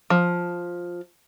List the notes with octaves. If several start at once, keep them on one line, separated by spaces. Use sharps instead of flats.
F3